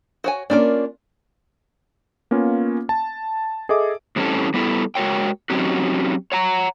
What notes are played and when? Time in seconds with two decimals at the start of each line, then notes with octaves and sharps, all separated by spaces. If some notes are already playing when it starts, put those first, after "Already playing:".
0.24 F#4 C#5 G#5
0.50 A#3 C#4 D4 F4 A#4 D5
2.31 A#3 B3 C#4 F4
2.89 A5
3.69 G#4 A4 D#5 E5 D6
4.16 A2 E3 G3 C4 C#4 A4
4.54 G3 B3 E4 G#4 A4
4.95 G#3 F#4 A#4 C#5 G5
5.50 F#3 C4 C#4 D#4 F#4 G4
6.32 C#5 F#5 A#5